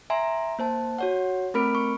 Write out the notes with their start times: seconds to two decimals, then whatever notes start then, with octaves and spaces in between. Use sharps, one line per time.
0.10 E5 G#5 A#5 C6
0.59 A#3 C5 A5
0.99 F#4 C#5 F#5
1.54 A3 C4 A#4 B5 F6 D7
1.75 C#6